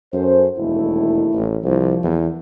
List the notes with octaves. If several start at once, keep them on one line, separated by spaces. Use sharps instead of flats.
F#2 C#4 A4 C5
E1 D#2 A3 E4
A1
C2 F3
E2